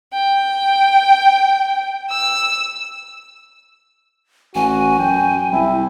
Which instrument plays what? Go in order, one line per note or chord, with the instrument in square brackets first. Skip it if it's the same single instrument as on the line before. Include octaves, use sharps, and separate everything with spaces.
[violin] G5
E6
[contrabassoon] A1 [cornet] F#4 [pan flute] G#5
[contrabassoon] F#2 [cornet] G5
[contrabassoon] C2 [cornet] E4